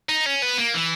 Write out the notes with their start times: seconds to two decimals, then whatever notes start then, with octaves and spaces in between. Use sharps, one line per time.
0.09 D#4
0.26 C#4
0.42 B3
0.58 A#3
0.74 E3